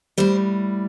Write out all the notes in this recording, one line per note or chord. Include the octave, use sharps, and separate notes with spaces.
A2 G3 C5